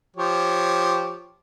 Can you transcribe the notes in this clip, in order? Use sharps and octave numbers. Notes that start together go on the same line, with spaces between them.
F3 G4 C#5